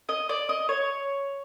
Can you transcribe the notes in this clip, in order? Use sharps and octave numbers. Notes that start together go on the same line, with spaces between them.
D#5
D5
D#5
C#5